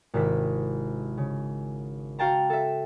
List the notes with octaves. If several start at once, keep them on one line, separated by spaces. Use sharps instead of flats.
G#1 C3 E4 B6
C#3
F#4 F5 G5 A5 A#5
A4 E5